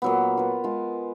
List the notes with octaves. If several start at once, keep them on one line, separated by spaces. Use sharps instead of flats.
A#2 F#3 B3
F4 B4
G#3 F4